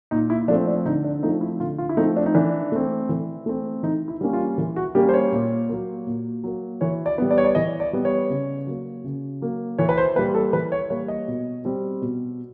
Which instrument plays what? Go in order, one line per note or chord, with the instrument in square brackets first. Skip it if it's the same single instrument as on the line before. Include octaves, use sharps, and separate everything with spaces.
[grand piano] A#2 D#4
E4
F3 A3 C4 D4
D4
D3 D#4
D4
F3 A3 C4 D#4
E4
D3 F4
F4
E4
F3 A3 C4 D#4
D4
D#4
E3 D4
A3 C4
E3
A3 C4
E3 D#4
E4
G3 A#3 C#4
F4
E3
F#4
G3 A#3 C#4 G4
C5
C#5
A#2
F#3 A#3
A#2
F#3 A#3
E3 C#5
D5
G3 B3
D5
C#5
D5
E3 D#5
D5
G3 B3
C#5
C#3
F#3 A#3
C#3
F#3 A#3
E3 C#5
B4
C5
A#3 B4
G3
A4
E3 B4
C#5
G3 A#3 C#5
D#5
B2
G3 C4
B2